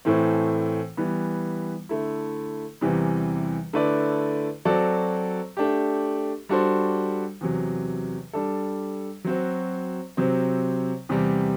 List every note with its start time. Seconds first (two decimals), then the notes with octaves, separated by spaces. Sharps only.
0.05 A2 E3 A3 C4
0.97 E3 G3 B3
1.89 D3 A3 E4
2.81 E2 C3 E3 G3
3.73 D3 A3 E4 B4 D5
4.65 F#3 C4 F#4 A4 D5
5.57 A3 D4 G4
6.49 G3 D4 F#4 A4 C5
7.41 E2 C3 F#3
8.33 G3 D4 A4
9.24 F#3 C4 F#4
10.17 C3 F#3 C4
11.09 E2 C3 G3